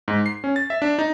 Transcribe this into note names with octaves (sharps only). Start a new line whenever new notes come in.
G#2
C7
C#4
A6
E5
D4
D#4